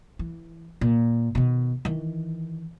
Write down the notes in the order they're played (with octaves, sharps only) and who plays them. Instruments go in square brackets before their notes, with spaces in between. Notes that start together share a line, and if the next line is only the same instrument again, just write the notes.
[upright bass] E3
A#2
B2 D#3
D#3 E3